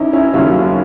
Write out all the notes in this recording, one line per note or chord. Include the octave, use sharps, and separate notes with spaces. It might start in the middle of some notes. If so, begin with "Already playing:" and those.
Already playing: E2 C#4 D#4 E4
C#4 E4
D#2 C#3 F#3 C#4 E4